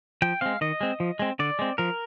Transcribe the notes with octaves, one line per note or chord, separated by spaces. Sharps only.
F3 G5
G#3 C4 F5
D#3 D#5
G#3 C4
F3
G#3 C4
D3 D5
G#3 C4
F3 A#4